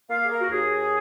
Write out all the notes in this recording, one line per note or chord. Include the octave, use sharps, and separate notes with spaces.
A#3 F5
G#4
A#4
F#4
D#2 G#4